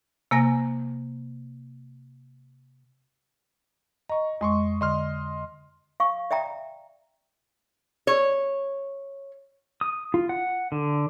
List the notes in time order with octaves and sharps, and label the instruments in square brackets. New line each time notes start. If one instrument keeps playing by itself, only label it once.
[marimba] C3 A#3 G#5 A#6
[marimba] D#5 [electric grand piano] A#5 C#6
[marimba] F2 G#3 [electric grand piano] D#5 C6 C#6
[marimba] D3 [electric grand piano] D#5 C6 F6
[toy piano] F5 C#6
D5 E5 G5 A#5
[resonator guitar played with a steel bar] C#5
[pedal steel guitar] D#6
F4
F#5
D3